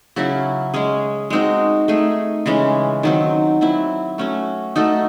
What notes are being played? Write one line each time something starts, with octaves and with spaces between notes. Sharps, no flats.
C#3 F#3 C#4 E4
G#3 C#4 G#4
G#3 C4 D#4 F#4
A3 D#4 G#4
C#3 E3 G#3 C#4
D#3 F#3 C4
F#3 C4 E4
A3 C#4 F#4
A3 D#4 F#4 A4